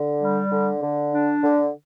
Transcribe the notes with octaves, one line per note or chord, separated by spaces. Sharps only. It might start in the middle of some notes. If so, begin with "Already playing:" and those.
Already playing: D3
G3
D3
D3
D4
D3